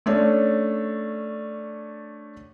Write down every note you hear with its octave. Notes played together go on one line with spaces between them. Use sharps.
A3 C#4 D4